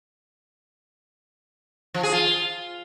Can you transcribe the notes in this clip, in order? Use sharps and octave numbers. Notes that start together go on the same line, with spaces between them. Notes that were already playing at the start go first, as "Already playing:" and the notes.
F3
G#4
F4